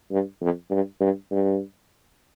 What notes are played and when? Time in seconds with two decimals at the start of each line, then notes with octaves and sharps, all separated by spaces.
0.11 G2
0.41 F2
0.70 G2
1.00 G2
1.31 G2